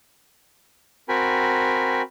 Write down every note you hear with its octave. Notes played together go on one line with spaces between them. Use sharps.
C4 F#4 A#4 G5 G#5 B5